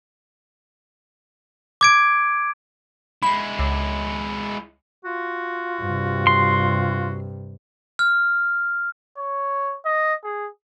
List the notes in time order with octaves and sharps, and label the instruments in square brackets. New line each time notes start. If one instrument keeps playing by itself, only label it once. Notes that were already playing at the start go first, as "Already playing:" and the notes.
[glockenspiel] D6 G#6 D7
[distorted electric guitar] G#3 E4 [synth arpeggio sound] B5
[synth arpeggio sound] C#2
[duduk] F4 [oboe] F#4
[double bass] G2 C3
[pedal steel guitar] C6
[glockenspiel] F6
[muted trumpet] C#5
D#5
G#4